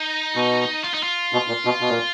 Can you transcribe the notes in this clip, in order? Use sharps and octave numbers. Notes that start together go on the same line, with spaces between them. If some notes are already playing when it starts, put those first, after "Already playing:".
Already playing: D#4
B2
F4
D#4
F4
B2
A#2
B2
B2
A#2